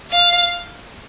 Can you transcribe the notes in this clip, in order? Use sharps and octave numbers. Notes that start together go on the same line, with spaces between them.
F5